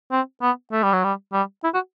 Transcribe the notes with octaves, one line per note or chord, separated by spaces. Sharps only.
C4
B3
A3
G3
F#3
G3
G3
E4
F#4